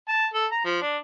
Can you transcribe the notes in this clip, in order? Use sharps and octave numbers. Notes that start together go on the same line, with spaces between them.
A5
A4
A#5
F3
D4